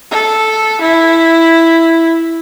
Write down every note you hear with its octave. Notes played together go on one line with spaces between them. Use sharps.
A4
E4